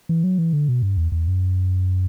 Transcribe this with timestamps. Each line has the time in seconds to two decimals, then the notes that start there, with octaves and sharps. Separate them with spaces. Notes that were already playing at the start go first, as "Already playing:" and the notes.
0.09 E3
0.24 F#3
0.38 E3
0.53 D3
0.69 B2
0.82 G2
0.97 E2
1.12 E2
1.28 F#2